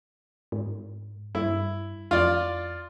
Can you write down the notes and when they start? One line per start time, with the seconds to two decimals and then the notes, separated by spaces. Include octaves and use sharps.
0.52 G#2
1.35 G2 E4
2.11 F2 F4 D5